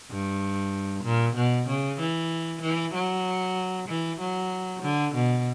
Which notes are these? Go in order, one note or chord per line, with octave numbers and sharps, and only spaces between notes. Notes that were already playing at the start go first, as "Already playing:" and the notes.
G2
A#2
B2
C#3
E3
E3
F#3
E3
F#3
D3
B2